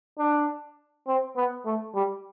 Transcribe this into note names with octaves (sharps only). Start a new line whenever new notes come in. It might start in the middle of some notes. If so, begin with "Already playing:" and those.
D4
C4
B3
A3
G3